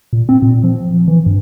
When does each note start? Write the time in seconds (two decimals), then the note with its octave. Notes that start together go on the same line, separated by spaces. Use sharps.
0.13 A#2
0.29 C4
0.42 A#2
0.64 F3
1.08 E3
1.26 G2